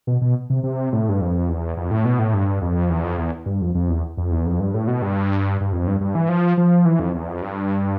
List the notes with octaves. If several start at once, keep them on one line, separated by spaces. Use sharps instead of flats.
B2
B2
C3
C3
A2
G2
F2
E2
F2
A2
B2
A2
G2
F2
E2
F2
E2
G2
F2
F2
E2
F2
E2
F2
G2
A2
B2
G2
G2
F2
G2
G2
E3
F3
F3
E3
F2
E2
F2
G2